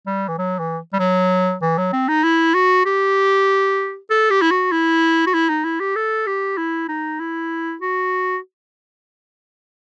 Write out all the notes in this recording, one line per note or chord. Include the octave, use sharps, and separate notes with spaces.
G3
E3
F#3
E3
G3
F#3
E3
F#3
C4
D#4
E4
F#4
G4
A4
G4
E4
F#4
E4
F#4
E4
D#4
E4
G4
A4
G4
E4
D#4
E4
F#4